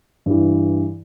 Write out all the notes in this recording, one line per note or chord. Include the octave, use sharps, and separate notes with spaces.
G2 E3